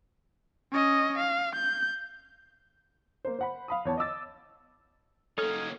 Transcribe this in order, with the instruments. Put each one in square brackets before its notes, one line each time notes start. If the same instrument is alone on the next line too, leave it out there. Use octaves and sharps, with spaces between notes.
[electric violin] C#4 D#5
F5
G6
[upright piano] A#3 C5
C5 F#5 B5
F5 B5 D#6
E2 C#5 A5
D#5 D6 E6 A6
[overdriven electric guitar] A#3 C#4 [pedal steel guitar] D#4 C#5 F6 [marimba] A4